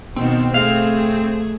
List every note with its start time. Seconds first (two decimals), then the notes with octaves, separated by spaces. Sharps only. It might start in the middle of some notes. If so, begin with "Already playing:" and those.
0.16 B2 D#3 B3 C4
0.54 A3 G#4 F5